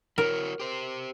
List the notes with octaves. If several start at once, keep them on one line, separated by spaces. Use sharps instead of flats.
E4 F#4 A#4 C#5
G4 C5